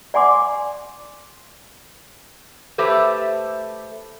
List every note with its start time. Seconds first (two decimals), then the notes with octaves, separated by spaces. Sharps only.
0.14 D5 F#5 G#5 C6 D6
2.78 A3 G4 B4 C5